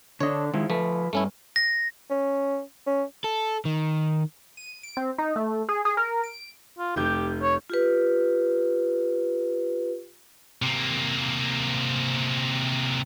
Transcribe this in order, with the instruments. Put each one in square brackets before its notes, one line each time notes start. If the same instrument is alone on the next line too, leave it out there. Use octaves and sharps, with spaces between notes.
[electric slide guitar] D3 D4 [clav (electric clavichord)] C#5 D#5
[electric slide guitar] D#3 G#3 E4 [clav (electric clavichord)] F3
[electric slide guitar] F3 B4 [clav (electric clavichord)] A3
[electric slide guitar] G2 [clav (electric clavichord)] A3 C#4 E4
[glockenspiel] A#6
[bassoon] C#4
C#4
[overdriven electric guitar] A4
D#3
[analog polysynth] D#7
D7
C4
D#4
A3
G#4
G#4
A#4
D7
[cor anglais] F4
[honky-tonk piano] F1 G6 [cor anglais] G4
[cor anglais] C#5
[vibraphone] F4 G4 B4
[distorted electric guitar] C3 A#3